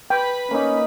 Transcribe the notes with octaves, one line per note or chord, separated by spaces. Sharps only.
B4 G5 B5
A#3 C#4 D#4